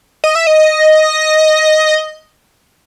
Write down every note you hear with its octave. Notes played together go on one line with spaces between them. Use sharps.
D#5
E5
D#5